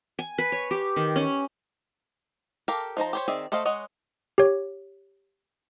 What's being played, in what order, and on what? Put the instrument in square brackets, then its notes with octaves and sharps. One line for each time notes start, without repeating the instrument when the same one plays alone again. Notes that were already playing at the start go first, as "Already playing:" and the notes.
[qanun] G#5
B4
C#5
G4
D#3
C#4
[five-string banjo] G4 A4 A#4 F5
F3 D#4 C5 A#5
G4 C5 C#5
D#3 C4 G#4 D5 E5
A3 A4 C5 D#5 F5
G#3 C#5 D#5 F#5
[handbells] G4 C#5